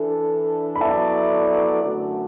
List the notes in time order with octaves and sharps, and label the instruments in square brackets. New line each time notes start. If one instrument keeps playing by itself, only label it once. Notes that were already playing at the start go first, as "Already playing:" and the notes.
Already playing: [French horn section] E3 D4 A4
[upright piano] B5
[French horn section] F#3 B3 E4 A4 D5 [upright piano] E5 A5
[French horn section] F#2 D3 A3 F#4